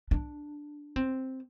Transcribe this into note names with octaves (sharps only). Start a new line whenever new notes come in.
D4
C4